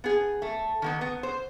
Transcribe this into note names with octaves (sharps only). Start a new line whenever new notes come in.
B3 G#4
A3
D#3 A#3 B3
B3
C5